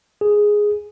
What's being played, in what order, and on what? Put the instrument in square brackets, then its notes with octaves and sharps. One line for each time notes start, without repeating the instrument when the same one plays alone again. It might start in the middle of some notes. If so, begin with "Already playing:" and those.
[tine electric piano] G#4